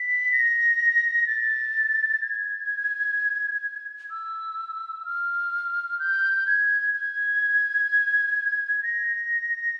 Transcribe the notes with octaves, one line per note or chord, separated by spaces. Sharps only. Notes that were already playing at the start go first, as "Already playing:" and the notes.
Already playing: B6
A#6
A6
G#6
E6
F6
G6
G#6
G#6
A#6